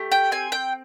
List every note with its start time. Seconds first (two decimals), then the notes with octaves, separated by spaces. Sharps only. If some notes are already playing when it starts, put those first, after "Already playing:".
Already playing: A3 G4
0.12 G5
0.31 C4 G#5
0.52 G5